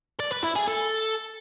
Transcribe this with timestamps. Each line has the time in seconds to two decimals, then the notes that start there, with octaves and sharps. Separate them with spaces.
0.20 D5
0.32 B4
0.44 E4
0.56 G#4
0.68 A4